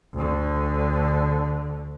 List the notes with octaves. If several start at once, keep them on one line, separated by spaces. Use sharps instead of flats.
D2 D3